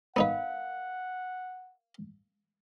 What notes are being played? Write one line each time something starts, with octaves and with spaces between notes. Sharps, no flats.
B3 D#4 A#4 B4 F5 F#5